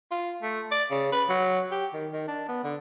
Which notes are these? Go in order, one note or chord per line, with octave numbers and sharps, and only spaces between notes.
F4
A3
D5
C#3
B4
F#3
G4
D#3
D#3
D4
B3
D3